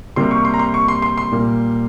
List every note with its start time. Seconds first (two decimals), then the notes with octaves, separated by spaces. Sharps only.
0.16 C3 G3 A#3 C6
0.31 C#6
0.45 C6
0.54 A#5
0.59 C6
0.74 C#6
0.88 C6
1.02 C6
1.17 C6
1.31 A#2 G3 A#3